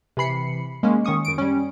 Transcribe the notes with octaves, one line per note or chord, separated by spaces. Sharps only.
C3 E3 B5 C7 C#7
G#3 A#3 C#4
D#3 C#4 C#6 D#6 C#7
F#2 D7
G3 C#4